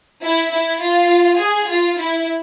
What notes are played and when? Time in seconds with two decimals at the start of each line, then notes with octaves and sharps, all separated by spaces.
0.22 E4
0.51 E4
0.81 F4
1.39 G#4
1.69 F4
1.99 E4